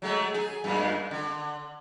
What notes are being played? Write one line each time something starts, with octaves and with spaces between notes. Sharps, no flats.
F#3 G#3 A3
G#4
F#2 A#2 G#3
D3